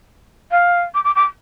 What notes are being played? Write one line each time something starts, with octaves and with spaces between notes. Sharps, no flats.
F5
D6
D6
D6